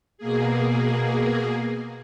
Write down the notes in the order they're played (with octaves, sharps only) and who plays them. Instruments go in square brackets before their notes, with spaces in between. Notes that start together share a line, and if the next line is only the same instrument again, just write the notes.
[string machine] B2 A#3 G#4